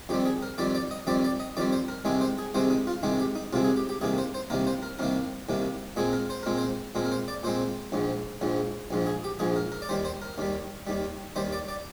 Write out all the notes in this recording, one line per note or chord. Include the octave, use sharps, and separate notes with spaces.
F2 D#3 G3 C4 G4
G#4
A#4
F2 D#3 G3 C4 D5
D5
D#5
F2 D#3 G3 C4 D5
D5
D#5
F2 D#3 G3 C4 D5
C5
A#4
C2 C3 D#3 G#3 C4 G#4
C5
G#4
C2 C3 D#3 G#3 C4 C5
D#4
F4
C2 C3 D#3 G#3 C4 D#4
G4
D#4
C2 C3 D#3 G#3 C4 F4
G#4
G4
G4
C2 C3 D#3 A#3 G#4
C5
C5
C2 C3 D#3 A#3 A#4
C5
A#4
C2 C3 D#3 A#3 A#4
C2 C3 D#3 A#3
A#2 G#3 C4 G#4
A#4
C5
A#2 G#3 C4 A#4
C5
A#2 G#3 C4 A#4
A#4
C5
D5
A#2 G#3 C4 C5
A#1 G#2 F3
A#1 G#2 F3
A#1 G#2 F3
G#4
G4
A#1 G#2 F3 G#4
A#4
A#4
D5
D#2 D#3 G3 C5
C5
A#4
D#2 D#3 G3
D#2 D#3 G3
D#2 D#3 G3 C5
D5
D5